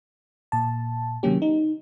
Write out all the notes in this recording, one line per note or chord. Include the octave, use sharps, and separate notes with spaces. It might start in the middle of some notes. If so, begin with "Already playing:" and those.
A#2 A5
C3 D#3 F#3 A#3 C#4 G4
D#4